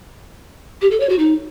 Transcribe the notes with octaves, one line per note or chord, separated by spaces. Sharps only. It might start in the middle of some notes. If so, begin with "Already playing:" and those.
G4
A4
C#5
F#4
D#4